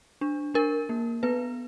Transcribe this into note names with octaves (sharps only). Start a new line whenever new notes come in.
D4
D4 A#4
A#3
B3 B4